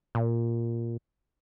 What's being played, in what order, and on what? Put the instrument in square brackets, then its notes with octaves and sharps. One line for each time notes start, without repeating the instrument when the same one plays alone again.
[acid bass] A#2